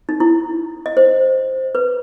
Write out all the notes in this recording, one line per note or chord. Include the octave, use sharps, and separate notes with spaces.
D#4
E4
D#5
C5
B4